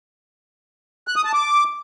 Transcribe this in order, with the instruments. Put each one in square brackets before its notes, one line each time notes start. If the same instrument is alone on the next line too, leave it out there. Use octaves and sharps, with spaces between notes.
[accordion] F#6
D#6
A5
D6